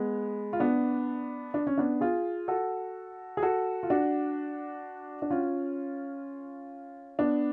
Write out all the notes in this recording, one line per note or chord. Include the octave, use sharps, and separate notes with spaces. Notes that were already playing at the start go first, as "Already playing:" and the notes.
Already playing: G#3 B3
F4
B3 D4
D4
C#4
B3 D4
F4 G#4
F#4 A4
G#4
F#4 A4
F4
D4 F#4
D4
C#4 F4
B3 D4